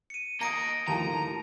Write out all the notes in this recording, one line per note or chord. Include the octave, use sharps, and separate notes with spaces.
C#7 D#7
A#3 D#5 A#5 A#6 D7
D#2 A2 F3 A5 A#5